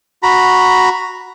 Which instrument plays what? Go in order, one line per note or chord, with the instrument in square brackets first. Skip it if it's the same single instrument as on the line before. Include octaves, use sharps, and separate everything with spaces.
[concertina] F#4 A#5 B5